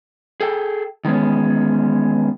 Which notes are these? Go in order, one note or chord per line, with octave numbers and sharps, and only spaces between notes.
G#4 A4 G5
D#3 E3 G#3 B3 C#4